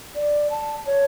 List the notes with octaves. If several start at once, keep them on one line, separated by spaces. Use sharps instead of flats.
D5
A5
C#5